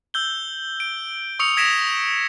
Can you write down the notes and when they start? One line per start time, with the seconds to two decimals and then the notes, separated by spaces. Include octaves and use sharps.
0.14 E6 G6 G7
0.80 D7
1.39 C#6 D#6 E6 C#7 F7
1.57 D#6 G#6 A#6 B6 D7 E7